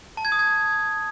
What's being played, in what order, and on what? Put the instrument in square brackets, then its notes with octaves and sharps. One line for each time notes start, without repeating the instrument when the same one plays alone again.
[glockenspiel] A5
G#6
D#6
G#6